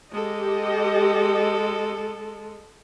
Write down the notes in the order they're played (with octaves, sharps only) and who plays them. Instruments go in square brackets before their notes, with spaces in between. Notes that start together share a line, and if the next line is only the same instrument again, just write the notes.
[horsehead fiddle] G#3 A4 [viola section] G4 D#5